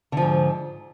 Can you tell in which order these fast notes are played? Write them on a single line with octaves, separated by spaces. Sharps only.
D3 F3 G#2